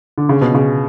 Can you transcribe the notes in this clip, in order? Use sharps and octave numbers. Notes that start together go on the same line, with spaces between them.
D3
C#3
B2
C#3